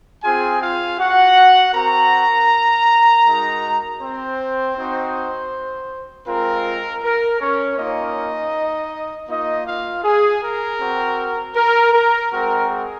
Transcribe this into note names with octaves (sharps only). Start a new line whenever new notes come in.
C4 F4 G#4 G#5
F4 F5
F#4 F#5
C4 F#4 A#4 A#5
G#3 D#4 F#4
C4 C5
C4 D#4 F#4
G#3 C4 F4 A#4
A#4
C#4 C#5
A#3 C#4 D#4 F4 D#5
A#3 D#4 F4 D#5
F4 F5
G#4
A#4
C4 F#4
A#4
A#4
G#3 C4 F#4 A#4
G#4